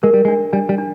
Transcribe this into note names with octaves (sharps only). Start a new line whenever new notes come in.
G#3 A#4
G3
G#3 D4
G3 D4
G3
D4